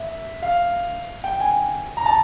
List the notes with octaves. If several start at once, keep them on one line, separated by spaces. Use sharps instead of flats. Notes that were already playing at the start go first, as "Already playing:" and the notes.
Already playing: E5
F5
G5
G#5
A#5
A5